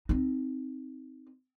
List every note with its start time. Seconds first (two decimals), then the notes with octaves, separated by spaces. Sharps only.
0.09 C4 D#4